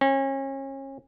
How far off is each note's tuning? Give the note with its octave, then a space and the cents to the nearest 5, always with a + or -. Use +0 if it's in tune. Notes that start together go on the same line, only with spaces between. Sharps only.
C#4 -35